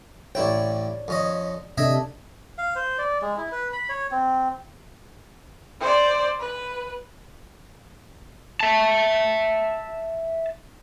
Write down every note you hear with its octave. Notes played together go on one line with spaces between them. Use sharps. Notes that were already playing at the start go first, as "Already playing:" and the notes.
A1 E4 C#5 D5 G5
F2 C#4 D#5
C3 D4 A4 D#5 E5 G#5
F5
C5
D5
G#3
E4
B4
B5
C#5
C4
C5 D5
B4
E5 A5